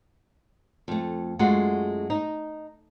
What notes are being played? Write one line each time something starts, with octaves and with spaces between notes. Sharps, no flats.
F2 A3
F#2 G#3 A3 F4 F#4
D#4